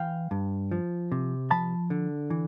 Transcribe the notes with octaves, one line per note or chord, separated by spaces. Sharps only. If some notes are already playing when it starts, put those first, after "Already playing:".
Already playing: E3 F5 G5
G2
F3
C3
F3 A5 B5
D3
E3